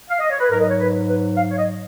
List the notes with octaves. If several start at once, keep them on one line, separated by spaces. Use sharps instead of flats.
F5
D#5
C#5
B4
G#2 F#3 A#4
D#5
C#5
B4
B4
F5
C#5
D#5